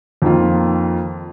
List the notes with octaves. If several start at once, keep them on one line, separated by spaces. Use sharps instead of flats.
F2 D#3 A#3 F4